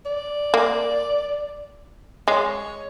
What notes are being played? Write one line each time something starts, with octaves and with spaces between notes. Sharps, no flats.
D5
A#3
G#3 C#5